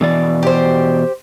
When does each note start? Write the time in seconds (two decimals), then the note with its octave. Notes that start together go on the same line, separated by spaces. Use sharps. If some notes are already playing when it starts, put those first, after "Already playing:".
0.01 B2 E3 D5
0.43 G4 C5